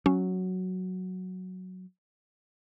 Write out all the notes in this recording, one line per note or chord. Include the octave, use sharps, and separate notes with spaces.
F#3 C#4